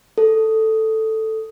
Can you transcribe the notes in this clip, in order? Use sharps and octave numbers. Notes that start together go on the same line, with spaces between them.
A4